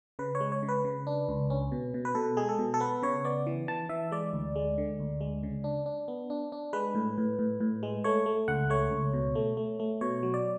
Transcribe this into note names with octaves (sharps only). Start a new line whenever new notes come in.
C#3 B4
C#5
G#3
C#5
C#3
B4
C#3
D4
C#2
C#4
B2
B2
B4
B2 A4
G#3 G#4
A4
B2
A4
B3 B4
C#3 C#5
B3 D5
E3
E3 A5
E3 E5
G#3 D5
D2
G#3
D3
D2
G#3
C#3
D4
D4
B3
D4
D4
G#3 B4
A2
A2
A2
A2
G#3
A3 C#5
A3
C#2 F#5
A3 C#5
C#2
B2
A3
A3
A3
B2 C#5
F#3
D5